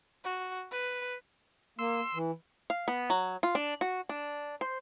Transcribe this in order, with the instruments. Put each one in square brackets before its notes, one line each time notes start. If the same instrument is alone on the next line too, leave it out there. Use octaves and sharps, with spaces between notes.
[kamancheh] F#4
B4
[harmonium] A#3 [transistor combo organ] C6 E6
[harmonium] E3
[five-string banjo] F5
B3
F#3
F4
D4
F#4
D4
C5